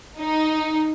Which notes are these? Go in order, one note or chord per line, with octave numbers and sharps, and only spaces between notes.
D#4